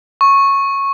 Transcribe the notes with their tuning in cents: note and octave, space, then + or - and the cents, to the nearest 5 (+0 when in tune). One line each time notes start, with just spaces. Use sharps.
C#6 -10